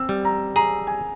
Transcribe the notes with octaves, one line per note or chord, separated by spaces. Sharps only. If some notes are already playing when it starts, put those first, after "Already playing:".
Already playing: C4 E6
G3
A#5
G#4 A#5
G#5